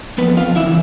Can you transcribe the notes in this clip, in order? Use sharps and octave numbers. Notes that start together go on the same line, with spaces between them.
F2 B3 B4
F4 F5
C#3 E3 E4 E5